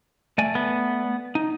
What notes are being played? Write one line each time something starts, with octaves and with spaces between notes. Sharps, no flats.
A3 D5 G#5
B3
D#4